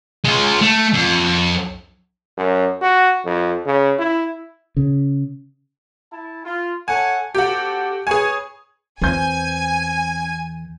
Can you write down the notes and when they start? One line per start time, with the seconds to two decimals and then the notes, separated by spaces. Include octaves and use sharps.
0.25 G#3 F4
0.62 A3
0.93 F2
2.38 F#2
2.82 F#4
3.25 F2
3.66 C#3
3.99 E4
4.77 C#3
6.11 E4 A5
6.44 F4
6.88 A4 C#5 F#5 G#5
7.35 C4 F#4 G4 A4
8.07 G#4 B4 C#5 G#5
9.02 E2 C4 G#5 G6